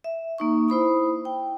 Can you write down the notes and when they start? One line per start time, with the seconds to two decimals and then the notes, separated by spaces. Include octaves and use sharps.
0.04 E5
0.38 A#3 D#4 C#6
0.68 E4 C5 B5 D#6
1.25 G5